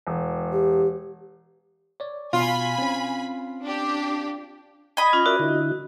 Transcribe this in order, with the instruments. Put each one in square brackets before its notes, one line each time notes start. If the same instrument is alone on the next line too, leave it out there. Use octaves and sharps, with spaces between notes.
[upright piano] E1
[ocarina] G4
[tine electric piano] C#5 D5
[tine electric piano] B2 [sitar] F4 [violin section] G#5 B5
[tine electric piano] C4 C#4
[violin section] D4 G4
[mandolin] D#5 B5 [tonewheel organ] G#6
[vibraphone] C#4 F4
[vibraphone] F#4 [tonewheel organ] A#4 D5 E5
[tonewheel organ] D3 E4